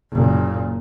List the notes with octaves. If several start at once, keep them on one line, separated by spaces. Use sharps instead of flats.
F#1 A#2